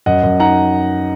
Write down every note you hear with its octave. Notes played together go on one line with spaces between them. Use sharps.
F#2 D#5 F#5
F#2
D#4 F#5 A#5